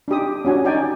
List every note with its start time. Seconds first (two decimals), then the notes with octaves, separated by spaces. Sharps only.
0.08 D4 D#4 G4 D#6
0.45 C#4 D4 F#4 G#5
0.65 D#4 D5 G5 G#5